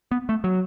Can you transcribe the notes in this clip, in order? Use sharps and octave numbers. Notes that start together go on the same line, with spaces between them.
B3
A3
F#3